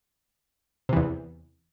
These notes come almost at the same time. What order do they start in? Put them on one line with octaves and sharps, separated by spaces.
C3 E3 E2